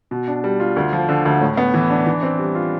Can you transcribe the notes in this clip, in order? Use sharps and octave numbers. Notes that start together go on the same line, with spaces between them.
B2
D4
G3
F4
D2
F3
D3
D2
A2
B3
E3
D4
E3
C4
G3
F4